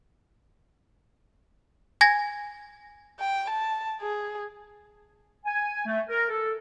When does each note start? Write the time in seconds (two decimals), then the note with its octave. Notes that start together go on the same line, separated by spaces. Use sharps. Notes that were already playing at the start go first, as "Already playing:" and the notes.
2.01 G#5 G#6 A#6
3.20 G5
3.50 A5
4.01 G#4
5.46 G#5
5.86 A3
6.09 A#4
6.29 A4